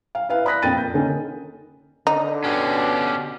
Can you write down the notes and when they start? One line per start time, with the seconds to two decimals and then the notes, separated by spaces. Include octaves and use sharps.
0.15 F5
0.29 E4 B4 F5
0.45 D5 B5 D#6 F#6 A#6 B6
0.62 F2 A#3 G5 A6 D#7
0.77 G6
0.94 D3 A#3 C#4 D#4
2.07 D3 D#4
2.44 B2 C#4 G4